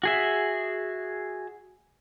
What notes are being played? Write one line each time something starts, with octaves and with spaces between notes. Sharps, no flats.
F#4 G#4 E5